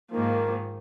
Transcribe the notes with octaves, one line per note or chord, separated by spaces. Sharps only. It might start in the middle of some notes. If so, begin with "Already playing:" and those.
G#2 D#3 F3 A#3